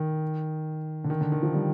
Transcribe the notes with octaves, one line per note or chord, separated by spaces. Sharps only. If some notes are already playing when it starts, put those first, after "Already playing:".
Already playing: D#3
D3
D#3
D3
D#3
F3
G3